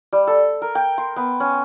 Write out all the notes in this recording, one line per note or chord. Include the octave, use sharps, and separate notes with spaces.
G3
A4
A#4
G5
C6
B3
C#4